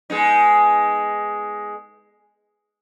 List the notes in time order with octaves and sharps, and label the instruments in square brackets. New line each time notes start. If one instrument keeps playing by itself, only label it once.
[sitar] G#3 B3 D#4